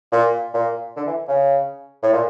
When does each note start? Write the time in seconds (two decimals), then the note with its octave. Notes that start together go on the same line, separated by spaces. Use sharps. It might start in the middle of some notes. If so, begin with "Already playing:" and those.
0.12 A#2
0.54 A#2
0.96 D3
1.07 E3
1.28 C#3
2.02 A2
2.13 A#2